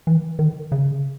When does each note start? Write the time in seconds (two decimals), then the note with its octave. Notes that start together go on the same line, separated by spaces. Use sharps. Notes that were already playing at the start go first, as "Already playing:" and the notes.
0.07 E3
0.39 D#3
0.72 C#3